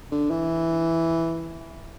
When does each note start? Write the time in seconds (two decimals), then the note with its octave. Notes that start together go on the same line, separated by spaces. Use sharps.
0.11 D3
0.30 E3